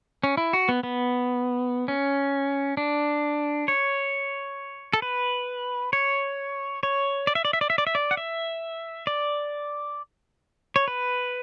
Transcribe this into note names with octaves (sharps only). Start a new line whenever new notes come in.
C#4
E4
F#4
B3
B3
C#4
D4
C#5
A4
B4
C#5
C#5
D5
E5
D5
E5
D5
E5
D5
E5
D5
F#5
E5
D5
C#5
B4